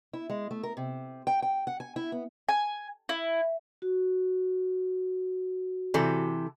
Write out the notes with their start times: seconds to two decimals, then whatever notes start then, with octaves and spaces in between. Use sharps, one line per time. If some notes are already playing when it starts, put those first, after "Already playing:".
0.13 E4
0.30 G#3
0.51 A3
0.63 A#4
0.77 C3
1.27 G5
1.42 G5
1.67 F#5
1.80 G#5
1.96 E4
2.12 B3
2.49 G#5
3.09 E4
3.82 F#4
5.94 C3 E3 A4